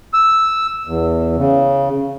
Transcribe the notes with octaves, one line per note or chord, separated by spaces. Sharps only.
E6
E2
C#3